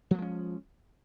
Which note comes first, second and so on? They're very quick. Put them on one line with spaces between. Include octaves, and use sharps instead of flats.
F3 A3 G#3 C#4